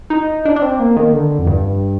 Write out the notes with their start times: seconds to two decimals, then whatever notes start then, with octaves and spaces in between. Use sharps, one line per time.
0.10 D#4
0.45 D4
0.56 D4
0.62 C4
0.80 A#3
0.97 D#3
1.13 D3
1.39 F2
1.47 G2